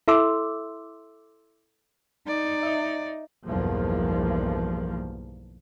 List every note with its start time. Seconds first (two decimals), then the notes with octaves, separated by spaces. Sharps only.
0.08 E4 A4 E5 C6 D6 E6
2.28 D#4 D5
2.63 D#5 E5
3.47 B1 E2 G2 F3 A#3